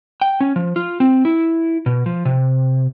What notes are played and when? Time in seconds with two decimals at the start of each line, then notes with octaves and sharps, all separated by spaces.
0.21 G5
0.41 C#4
0.56 F3
0.76 F4
1.00 C4
1.25 E4
1.86 B2
2.06 F3
2.25 C3